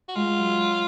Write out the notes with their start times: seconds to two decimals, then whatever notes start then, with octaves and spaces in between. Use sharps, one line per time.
0.08 F#4
0.15 G#3 F4
0.38 F#3